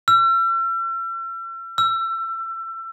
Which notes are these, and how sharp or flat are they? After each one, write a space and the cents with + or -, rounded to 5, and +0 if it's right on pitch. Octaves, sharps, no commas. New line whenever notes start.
E6 +40
E6 +30